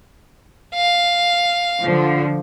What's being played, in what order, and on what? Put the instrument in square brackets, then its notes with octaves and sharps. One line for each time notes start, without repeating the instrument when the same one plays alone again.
[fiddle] F5
[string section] D3 F3